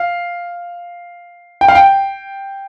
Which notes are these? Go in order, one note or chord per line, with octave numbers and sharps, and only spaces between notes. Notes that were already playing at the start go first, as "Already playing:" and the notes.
Already playing: F5
G5
F5
G5